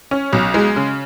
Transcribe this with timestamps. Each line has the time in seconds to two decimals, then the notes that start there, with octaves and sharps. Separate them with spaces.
0.11 C#4
0.33 B1
0.54 G#3
0.76 C#3